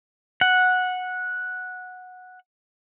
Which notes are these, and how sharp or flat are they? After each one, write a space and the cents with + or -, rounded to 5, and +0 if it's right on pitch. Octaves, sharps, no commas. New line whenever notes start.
F#5 -10